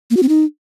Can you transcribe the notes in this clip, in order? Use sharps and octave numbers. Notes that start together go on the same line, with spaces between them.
A#3
F#4
C4
D#4